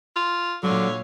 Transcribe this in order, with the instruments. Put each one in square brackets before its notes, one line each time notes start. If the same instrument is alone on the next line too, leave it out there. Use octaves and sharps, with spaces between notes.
[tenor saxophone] F4
[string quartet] A#2 C#5 F5 [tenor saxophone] D3 [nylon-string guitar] F#3